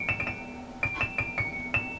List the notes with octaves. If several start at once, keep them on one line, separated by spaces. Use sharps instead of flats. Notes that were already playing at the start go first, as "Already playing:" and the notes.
Already playing: C#7 D7
E7
D7
E7
D7
E7
D7
C#7
E7